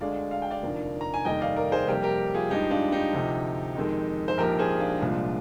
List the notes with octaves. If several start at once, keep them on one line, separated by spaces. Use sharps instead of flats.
D2 D3 G#3 D5 F5
F5
G5
D5 F5
F1 D#2 D3 F3 A#3
A#5
G#5
F1 D#2 D#3 G3 D#5 G5
D5 F5
A#4 D5
G#4 C5
F2 C3 G3 A#3 G4 A#4
G4 A#4
F4 G#4
G2 F3 G#3 D#4 G4
D4 F4
D#4 G4
D2 C3 F3
F2 D#3 G#3
C5
A#1 G#2 F3 A#3 G4 A#4
G#4 C5
D4 F4
C2 A#2 F3 G#3